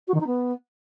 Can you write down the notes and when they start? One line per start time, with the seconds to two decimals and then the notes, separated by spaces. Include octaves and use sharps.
0.08 F#4
0.14 D#3
0.20 D#4
0.27 B3